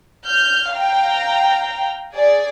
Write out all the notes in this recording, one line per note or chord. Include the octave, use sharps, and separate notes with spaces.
F6 G6
F5 G5 A#5
G#4 D5